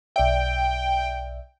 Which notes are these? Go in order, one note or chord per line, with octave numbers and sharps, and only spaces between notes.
B1 D5 E5 G5